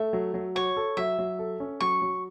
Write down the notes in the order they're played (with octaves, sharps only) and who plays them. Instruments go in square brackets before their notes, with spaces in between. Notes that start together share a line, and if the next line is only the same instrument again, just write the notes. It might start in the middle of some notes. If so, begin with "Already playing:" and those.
Already playing: [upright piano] A3 [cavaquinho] E5
[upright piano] F#3
F#3
[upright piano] F#4 [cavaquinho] C#5
[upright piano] A4
[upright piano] F#3 [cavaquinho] E5
[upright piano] F#3
A4
C#4
[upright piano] F#3 [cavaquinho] C#6
[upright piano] F#3